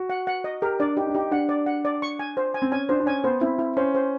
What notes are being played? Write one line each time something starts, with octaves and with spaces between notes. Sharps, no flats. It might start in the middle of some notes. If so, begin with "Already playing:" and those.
Already playing: F#4
F#5
F#5
D#5
G4 A#4
D4 D5
D#4 G4
D4
D#4 G4
D4 F#5
D5
F#5
D5
C#6
G#5
C5
G#5
C4
C#4 G#5
D4 C5
D4
C#4 G#5
B3 C5
C4 E4
E4
C#4 C5
C5